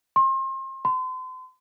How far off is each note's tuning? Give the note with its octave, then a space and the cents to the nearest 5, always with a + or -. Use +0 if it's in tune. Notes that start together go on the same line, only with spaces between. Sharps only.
C6 +35
C6 -40